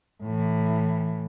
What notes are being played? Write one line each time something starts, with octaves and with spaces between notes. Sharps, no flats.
A2 E3